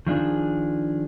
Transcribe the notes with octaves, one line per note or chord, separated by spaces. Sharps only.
D#3 F3 D4 G#4